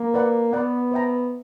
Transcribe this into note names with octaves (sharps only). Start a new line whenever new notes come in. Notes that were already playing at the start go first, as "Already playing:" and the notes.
Already playing: A#3
B4 D5 F#5
B3 B4 D5 F#5
C5 E5 G5 A#5